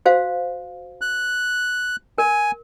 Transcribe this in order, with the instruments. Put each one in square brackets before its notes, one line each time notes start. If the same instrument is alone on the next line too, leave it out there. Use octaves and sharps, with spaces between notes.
[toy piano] F#4 C5 F5
[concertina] F#6
[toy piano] A#4 [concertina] G#5